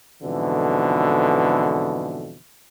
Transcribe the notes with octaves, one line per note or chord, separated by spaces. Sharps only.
F2 G#2 B2 D3 E3